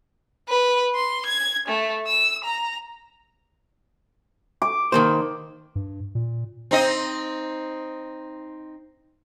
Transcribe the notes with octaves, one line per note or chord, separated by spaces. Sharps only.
B4
C6
G#6
A3
E6
A#5
D6
D#3 A#3 C5
G2
A#2
C4 D#4 D#5